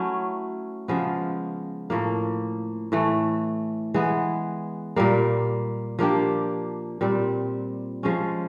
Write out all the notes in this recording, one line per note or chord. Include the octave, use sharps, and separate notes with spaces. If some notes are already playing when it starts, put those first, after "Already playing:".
Already playing: F#3 A3 C#4 E4
C#3 F3 G#3 B3
A2 F3 A#3
A2 E3 A3
E3 G#3 B3
A#2 G3 A#3
F3 A#3 D4 G4
A#2 G3 C4
F3 G#3 C#4